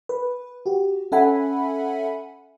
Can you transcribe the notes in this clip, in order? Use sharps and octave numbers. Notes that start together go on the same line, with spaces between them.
B4
F#4 G4
C#4 A4 E5 F#5 G#5 B5